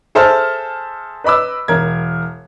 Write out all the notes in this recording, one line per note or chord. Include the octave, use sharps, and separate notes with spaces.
G#4 A4 C5 E5 A5 F6
B4 D#5 B5 D6 E6
E1 A#4 G#6